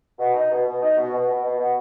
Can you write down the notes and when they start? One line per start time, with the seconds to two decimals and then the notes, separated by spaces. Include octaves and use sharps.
0.19 B2
0.34 D#4
0.51 B2
0.66 B2
0.81 D#4
0.97 B2
1.12 B2
1.28 B2
1.44 B2
1.58 B2